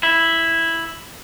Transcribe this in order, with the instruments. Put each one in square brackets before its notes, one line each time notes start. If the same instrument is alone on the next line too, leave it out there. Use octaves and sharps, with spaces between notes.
[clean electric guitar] E4